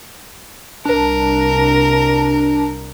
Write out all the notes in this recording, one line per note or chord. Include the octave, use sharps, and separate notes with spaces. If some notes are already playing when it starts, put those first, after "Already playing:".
C2 D4 A#4